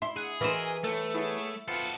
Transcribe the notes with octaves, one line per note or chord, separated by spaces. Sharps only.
E4 C6
G#4 F#5
E3 F#4 A#4 C5 D#5
A2 A3 A4
B3 E4 G#4 C#5
B3 C4 F4 F#4 A4